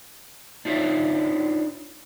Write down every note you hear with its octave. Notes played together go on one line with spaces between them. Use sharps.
D4 D#4 F4 C#5 E5